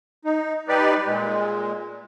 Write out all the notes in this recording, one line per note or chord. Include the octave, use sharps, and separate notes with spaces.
D#4
G3 D#4 G4 B4 D5
A#2 G#3